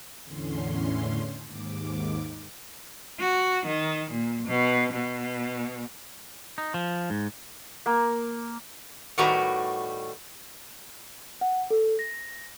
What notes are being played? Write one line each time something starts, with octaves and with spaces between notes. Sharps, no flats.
E2 A2 D3 C#4 C6
D#2 G#2 D6
F#4
D#3
A#2
B2
B2
D#4
F3
G#2
A#3
A2 D#3 G3 F#4 B4 A#5
F#5
A4
A#6